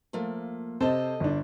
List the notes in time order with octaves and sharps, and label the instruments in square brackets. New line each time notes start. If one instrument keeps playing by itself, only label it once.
[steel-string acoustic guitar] F3 A3 A#3
[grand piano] C3 C5 A5 [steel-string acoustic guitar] A4 D#5
[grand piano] G1 D4